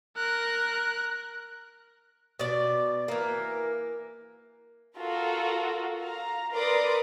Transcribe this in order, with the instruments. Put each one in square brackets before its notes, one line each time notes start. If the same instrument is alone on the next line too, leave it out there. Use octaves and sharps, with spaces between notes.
[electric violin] A#4 F#6
[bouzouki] B2 D5
[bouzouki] E3 A#3 [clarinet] A#4
[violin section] F4 F#4 A4 A#4
F5 A#5
A#4 B4 D5 C6 D6 D#6